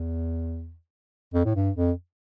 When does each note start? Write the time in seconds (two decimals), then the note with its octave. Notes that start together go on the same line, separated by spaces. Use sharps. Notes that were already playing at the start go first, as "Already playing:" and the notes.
Already playing: E2
1.34 F2
1.45 A2
1.55 G2
1.76 F2